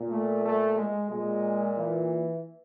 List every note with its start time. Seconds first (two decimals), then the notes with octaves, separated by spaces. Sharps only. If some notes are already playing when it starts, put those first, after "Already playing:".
Already playing: A#2
0.10 A3
0.44 A3
0.77 G#3
1.10 A#2 G#3
1.78 E3